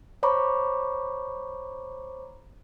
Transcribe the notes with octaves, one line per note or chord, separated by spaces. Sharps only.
C5 C#5 A#5 B5 C#6 D6